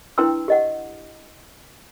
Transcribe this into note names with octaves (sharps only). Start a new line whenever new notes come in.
D4 E4 B4 G5 C6 E6
G4 D#5 F#5